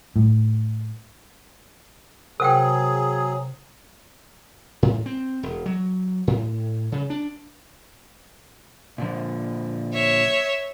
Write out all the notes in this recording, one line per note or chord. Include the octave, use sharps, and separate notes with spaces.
A2
C3 F#3 G#4 A#4 F#5 G5
A2
C4
E1
F#3
A2
C#3
D4
A#2 D3 F3
C#5 E5